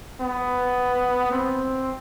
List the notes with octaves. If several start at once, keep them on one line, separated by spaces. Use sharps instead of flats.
B3
C4